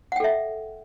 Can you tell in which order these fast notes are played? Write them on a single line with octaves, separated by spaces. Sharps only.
F#5 G5 A4 E5